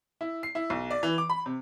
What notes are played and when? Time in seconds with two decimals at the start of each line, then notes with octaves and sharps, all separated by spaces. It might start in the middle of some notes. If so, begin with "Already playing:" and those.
0.21 E4
0.43 C7
0.55 E4
0.70 B1
0.91 D5
1.03 E3
1.18 D6
1.29 B5
1.46 C3